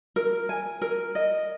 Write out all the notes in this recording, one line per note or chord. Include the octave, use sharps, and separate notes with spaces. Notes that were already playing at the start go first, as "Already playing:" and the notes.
A#4
G#5
A#4
D#5